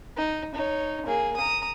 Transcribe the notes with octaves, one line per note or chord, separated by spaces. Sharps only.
D#4
D#4 C#5
A#3 G#4
A#5 D#6